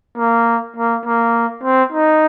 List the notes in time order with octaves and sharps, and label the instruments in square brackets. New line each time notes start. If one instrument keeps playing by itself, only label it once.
[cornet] A#3
A#3
A#3
C4
D#4